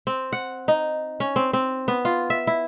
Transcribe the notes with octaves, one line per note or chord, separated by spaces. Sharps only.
C4
F#5
D#4
C#4
C4
C4
B3
F4
E5
E4